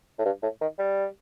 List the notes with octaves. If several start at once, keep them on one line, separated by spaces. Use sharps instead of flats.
A2
G2
A2
D#3
G3